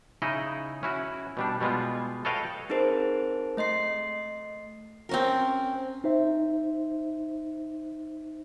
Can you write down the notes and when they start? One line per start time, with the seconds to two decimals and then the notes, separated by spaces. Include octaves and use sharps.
0.22 C#3 D#4 E4 D#5
0.83 C#4 E4 F#4
1.37 B2 G3 D4
1.61 B2 G3 G#3 B3 F4
2.25 A4 B4 C#5 D#5 F5 G5
2.69 C4 D#4 G#4 A#4 C5
3.57 A3 D#5 C6 C7
5.09 C4 C#4 A#4
6.04 D#4 C5 E5